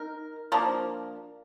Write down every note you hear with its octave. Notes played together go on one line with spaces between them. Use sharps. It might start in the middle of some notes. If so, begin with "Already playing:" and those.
Already playing: D#4 A#4
F3 A#3 D4